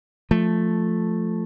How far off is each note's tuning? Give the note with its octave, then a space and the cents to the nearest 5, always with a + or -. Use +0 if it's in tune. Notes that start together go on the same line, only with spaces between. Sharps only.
F3 +5 A3 +0